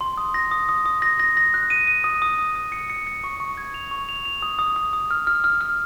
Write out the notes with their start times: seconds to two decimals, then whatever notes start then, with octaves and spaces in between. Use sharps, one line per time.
0.01 C6
0.18 D#6
0.34 A#6
0.51 D#6
0.69 D#6
0.86 D#6
1.02 A#6
1.20 A#6
1.37 A#6
1.54 F#6
1.70 D#7
1.87 D#7
2.04 D#6
2.22 D#6
2.38 D#6
2.55 D#6
2.72 C#7
2.90 C#7
3.07 C#7
3.24 C#6
3.40 C#6
3.57 G#6
3.74 F7
3.91 C#6
4.09 F7
4.25 F7
4.42 D#6
4.59 D#6
4.76 D#6
4.93 D#6
5.11 F6
5.27 F6
5.44 F6
5.61 F6